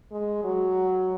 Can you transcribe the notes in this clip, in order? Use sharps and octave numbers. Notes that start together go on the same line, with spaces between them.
G#3
F#3